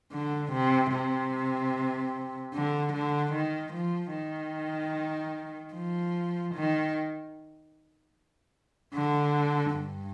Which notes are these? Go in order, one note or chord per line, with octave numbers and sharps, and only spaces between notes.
D3
C3
C3
D3
D3
D#3
F3
D#3
F3
D#3
D3
G2